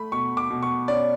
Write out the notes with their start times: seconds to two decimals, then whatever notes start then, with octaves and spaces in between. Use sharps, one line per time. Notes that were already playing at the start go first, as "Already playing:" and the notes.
Already playing: A3 B5
0.12 B2 C#6
0.37 D6
0.50 B2
0.63 C#6
0.88 C#4 D5